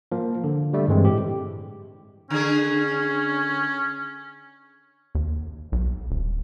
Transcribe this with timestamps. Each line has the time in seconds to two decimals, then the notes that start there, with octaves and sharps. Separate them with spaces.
0.12 F3 A#3
0.44 D3
0.73 D3 G3 A3
0.88 G2 E3 G#3 C4
1.05 A2 G4
2.30 D3 C#4 G#4
5.15 D#2
5.72 B1
6.10 D#1